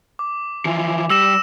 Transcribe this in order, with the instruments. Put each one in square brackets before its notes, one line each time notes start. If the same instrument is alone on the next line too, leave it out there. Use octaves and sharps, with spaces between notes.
[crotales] D6
[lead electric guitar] E3 F3
[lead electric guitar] G3 [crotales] E6 A#6 E7